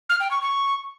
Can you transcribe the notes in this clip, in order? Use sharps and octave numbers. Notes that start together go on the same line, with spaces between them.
F6
G5
C#6
C#6